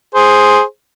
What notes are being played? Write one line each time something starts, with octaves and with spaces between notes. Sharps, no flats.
G#4 C5